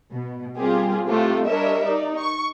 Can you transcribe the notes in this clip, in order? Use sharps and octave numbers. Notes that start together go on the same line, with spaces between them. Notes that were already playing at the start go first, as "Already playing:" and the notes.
B2
G3 A#3 C4 F4 G4 G#4
A2 C3 A3 F4 G4
G3 D4 A#4 C#5 D#5 E5
D#4 D5
C#6